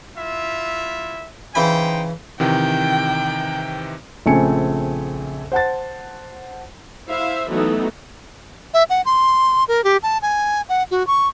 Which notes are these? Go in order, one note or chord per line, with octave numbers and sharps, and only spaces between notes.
E4 F4 E5
C#3 E3 D#4 C5 G5 B5
C3 D#3 E3 G5
A#1 C#3 A3 C4 G#5 C#7
C5 F#5 A5 A6
E4 C5 E5 F5
E3 F#3 A3 B3 D#4
E5
F#5
C6
A#4
G4
A5
G#5
F#5
F#4
C#6